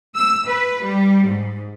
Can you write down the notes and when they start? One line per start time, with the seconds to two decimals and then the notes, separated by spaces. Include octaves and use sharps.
0.15 E6
0.47 B4
0.83 G3
1.26 G#2